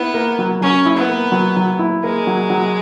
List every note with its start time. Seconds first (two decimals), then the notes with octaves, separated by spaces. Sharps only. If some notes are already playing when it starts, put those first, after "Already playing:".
Already playing: B3 E4
0.14 A#3
0.39 F#3
0.61 F#3 C#4
0.86 E4
0.97 B3
1.09 A#3
1.32 F#3
1.57 F#3
1.79 E4
2.04 G#3 A#3
2.27 F#3
2.50 F#3